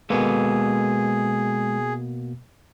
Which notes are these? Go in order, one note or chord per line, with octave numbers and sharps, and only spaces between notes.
B2 G#3 A#3 G#4 A4 B4